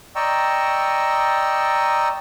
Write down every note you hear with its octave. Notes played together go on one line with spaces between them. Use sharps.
D5 D#5 G5 A#5 C#6 E6